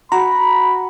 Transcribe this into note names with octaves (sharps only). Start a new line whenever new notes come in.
F#4 A#5 B5